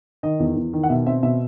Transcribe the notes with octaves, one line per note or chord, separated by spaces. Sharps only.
D#3 D#5
E2
E2
D#3
F#5
B2 E5
C4 E5
B2 E5